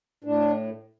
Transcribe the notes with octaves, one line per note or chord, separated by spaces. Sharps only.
A2 D4